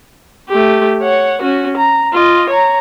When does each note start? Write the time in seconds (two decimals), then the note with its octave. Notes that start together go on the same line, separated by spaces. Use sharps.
0.49 A3 G4
1.02 C#5 F#5
1.42 C#4 F#4
1.77 A#5
2.13 F4 D#5
2.50 C#5 A#5